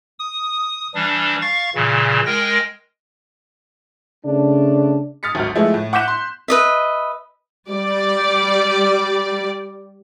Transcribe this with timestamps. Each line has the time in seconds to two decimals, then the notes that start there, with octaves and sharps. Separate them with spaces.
0.19 D#6
0.95 E3 G3 D4
1.42 F5 C#6 A6
1.75 A#2 C#3 E3
2.26 G#3 A#4 G5 A#6
4.25 C#3 A3 D4
5.23 D#6 F6 A6 B6 C#7
5.35 G#1 D2 F#3 F6
5.55 F3 G#3 A3 B3 E4
5.74 A2
5.93 F#5 D6 F#6 G6 B6 E7
6.08 C6
6.48 B4 D#5 E5
7.71 G3 D5